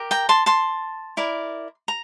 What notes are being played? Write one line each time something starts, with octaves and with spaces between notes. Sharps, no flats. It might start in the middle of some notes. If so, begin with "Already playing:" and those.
Already playing: G4 A#4
G5 A#5
A5 C6
A5 C6
E4 A#4 D5
A#5